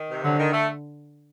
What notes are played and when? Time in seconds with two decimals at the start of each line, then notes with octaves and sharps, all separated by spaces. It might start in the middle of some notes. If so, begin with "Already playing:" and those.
Already playing: D#3
0.09 C3
0.23 D3 F#3
0.38 D#3
0.52 A3